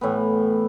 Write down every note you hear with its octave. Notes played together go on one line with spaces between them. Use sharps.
A2 E3 B3